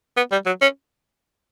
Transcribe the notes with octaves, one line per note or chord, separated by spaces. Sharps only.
B3
G3
F#3
C#4